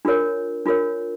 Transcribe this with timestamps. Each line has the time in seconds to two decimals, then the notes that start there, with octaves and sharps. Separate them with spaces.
0.05 D4 F4 A#4 C#5
0.66 D4 F4 A#4 C#5